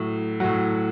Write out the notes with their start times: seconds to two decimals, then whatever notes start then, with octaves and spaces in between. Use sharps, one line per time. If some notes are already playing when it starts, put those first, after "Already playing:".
Already playing: A2 F#3
0.40 A2 F#3 F#5